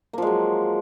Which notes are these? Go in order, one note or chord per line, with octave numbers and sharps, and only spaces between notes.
F3 F#3 G#3 A#3